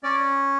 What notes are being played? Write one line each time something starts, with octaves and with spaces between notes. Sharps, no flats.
C#4 D5